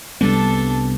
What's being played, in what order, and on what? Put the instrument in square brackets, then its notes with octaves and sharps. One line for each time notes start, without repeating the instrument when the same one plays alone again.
[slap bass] C2 G3 B3 [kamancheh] D4 A4